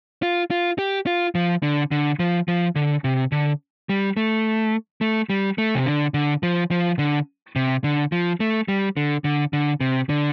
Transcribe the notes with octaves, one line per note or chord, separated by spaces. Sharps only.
F4
F4
G4
F4
F3
D3
D3
F3
F3
D3
C3
D3
G3
A3
A3
G3
A3
C3
D3
D3
F3
F3
D3
C3
D3
F3
A3
G3
D3
D3
D3
C3
D3